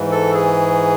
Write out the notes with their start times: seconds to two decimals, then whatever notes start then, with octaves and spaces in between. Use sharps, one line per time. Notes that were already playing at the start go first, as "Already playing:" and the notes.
Already playing: G#2 E3
0.11 A4
0.35 G#4